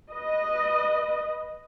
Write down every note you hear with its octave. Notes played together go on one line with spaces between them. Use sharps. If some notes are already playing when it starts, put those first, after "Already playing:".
B4 D#5